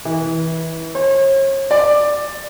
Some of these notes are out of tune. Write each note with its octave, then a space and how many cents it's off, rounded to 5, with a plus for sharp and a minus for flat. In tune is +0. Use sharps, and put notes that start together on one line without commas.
E3 -20
C#5 -40
D5 +10